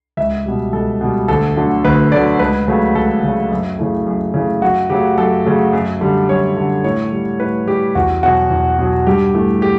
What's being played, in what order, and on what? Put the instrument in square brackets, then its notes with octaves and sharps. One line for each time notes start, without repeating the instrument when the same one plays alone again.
[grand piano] C#2 E5
B2 G3
C#2 A4
B2 G3
D2 A4
D3 F#3 A3
D2 B4
D3 F#3 A3 D5
C#2 B4
C#3 F#3 A3
C#2 A4
C#3 F#3 A3
F#2
C#3 E3 A3
F#2
C#3 E3 A3
F#2 F#4
C#3 F#3 A3 G4
F#2 A4
C#3 F#3 A3
F#2
D3 G3
F#2 C#5
D3 G3
A2 C#5
G3
A2 B4
G3 G4
E2 F#4
B2 F#3 F#4
E2
B2 F#3
G2 G4
E3 A3
G4